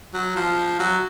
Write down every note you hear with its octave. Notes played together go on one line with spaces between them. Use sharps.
F#3
F3
F#3